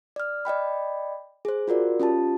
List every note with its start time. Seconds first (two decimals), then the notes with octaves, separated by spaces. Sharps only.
0.16 D5 F6
0.45 D5 D#5 G5 B5
1.45 G#4 C5
1.68 F4 F#4 A#4 D5
2.00 C#4 F4 G4 A5